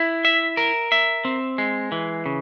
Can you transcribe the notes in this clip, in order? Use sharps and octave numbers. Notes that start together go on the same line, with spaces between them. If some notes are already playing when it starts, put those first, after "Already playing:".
Already playing: E4
E5
A#4
E5
C4
G#3
E3
C#3